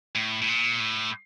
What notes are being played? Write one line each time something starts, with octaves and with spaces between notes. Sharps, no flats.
A2
A2
A#2
A2